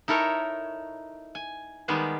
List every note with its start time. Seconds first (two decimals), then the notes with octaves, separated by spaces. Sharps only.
0.08 D#4 E4 A4 A#4 C#5
1.35 G#5
1.88 D#3 G3 G#3 B3 G#4